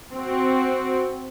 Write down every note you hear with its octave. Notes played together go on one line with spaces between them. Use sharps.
C4 F#4